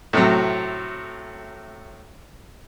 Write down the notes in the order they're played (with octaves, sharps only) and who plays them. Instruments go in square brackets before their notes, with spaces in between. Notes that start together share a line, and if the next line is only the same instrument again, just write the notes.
[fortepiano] A2 C3 F#3